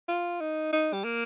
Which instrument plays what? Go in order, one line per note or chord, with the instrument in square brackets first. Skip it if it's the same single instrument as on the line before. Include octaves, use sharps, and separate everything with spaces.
[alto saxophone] F4
D#4
D#4
G3
A#3